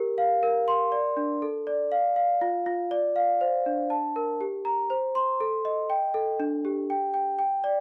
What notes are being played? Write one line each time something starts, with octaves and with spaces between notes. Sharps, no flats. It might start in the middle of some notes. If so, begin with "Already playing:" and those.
Already playing: G4 A#4
F5
A#4
C6
D5
D4
A4
D5
F5
F5
F4
F4
D5
F5
C5
D4
A5
A#4
G4
A#5
C5
C6
A4
D#5
G5
A4
D4
G4
G5
G5
G5
D5